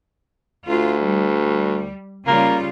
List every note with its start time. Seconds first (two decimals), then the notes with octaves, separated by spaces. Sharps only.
0.68 D2 F4
1.03 G3
2.27 C#3 G3 A#3 F4